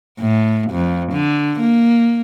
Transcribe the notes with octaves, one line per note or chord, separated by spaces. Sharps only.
A2
F2
D3
A#3